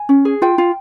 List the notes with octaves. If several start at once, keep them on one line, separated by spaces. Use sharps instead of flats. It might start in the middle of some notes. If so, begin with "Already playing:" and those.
Already playing: G#5
C#4
G#4
F4 G5
F4